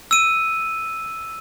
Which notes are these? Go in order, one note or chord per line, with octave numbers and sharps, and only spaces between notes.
E6 D#7